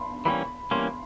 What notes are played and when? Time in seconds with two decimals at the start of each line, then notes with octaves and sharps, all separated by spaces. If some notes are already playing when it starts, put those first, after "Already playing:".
Already playing: B5 C6
0.25 E3 G3 A#3 C#4 B5
0.71 E3 G3 A#3 C#4 C6